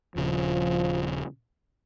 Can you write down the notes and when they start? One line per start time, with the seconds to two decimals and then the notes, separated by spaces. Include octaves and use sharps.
0.16 D#1 C#3 F3